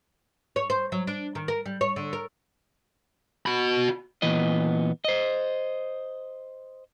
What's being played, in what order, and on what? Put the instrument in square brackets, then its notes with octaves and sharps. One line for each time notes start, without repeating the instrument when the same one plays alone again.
[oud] C#5
C5
F#3
D4
D#3
A#4
G3
C#5
D3
A#4
[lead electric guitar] F#4 B5
[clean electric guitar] A#2 E3 B3 D#5
C5 D#5